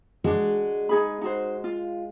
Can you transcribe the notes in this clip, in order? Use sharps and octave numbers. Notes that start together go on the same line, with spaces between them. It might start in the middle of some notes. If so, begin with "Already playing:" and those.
G#3 D4 F#4
D#4 G#4 B5
D#4 F#4 C5
F4